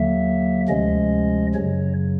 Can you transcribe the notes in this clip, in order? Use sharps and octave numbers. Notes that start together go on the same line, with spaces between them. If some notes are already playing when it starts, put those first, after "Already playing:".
Already playing: D#2 D3 F#3 A#3 E5
D2 C3 F3 G#3 C#4 D#5
F#2 C#3 F#3 C#5